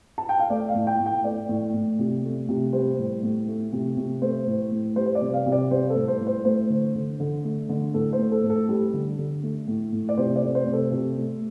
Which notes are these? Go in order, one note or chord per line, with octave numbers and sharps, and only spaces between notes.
A5
G5
F5
A3 D5
F5
A2
G5
A2
G5
A3 D5
A2
A2
C3
A3
C3
G3 C5
A2
A2
A3
C3
C3
A3 C5
A2
A2
G3 C5
C5
D5
C3
F5
C3
D5
G3 C5
A4
A2
C5
A2
C5
A3 C5
D3
D3
D3
A3
D3
A2 A4
C5
A3
A4
A2
A4
G3
D3
D3
A3
A2
A2
D5
C3 C5
D5
A3
C5
C3
A4
C3
A3